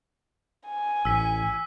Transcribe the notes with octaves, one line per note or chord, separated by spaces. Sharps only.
G#5
A1 E6 B6